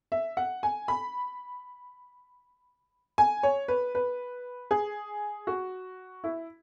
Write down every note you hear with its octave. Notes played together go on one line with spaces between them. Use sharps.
E5
F#5
G#5
B5
G#5
C#5
B4
B4
G#4
F#4
E4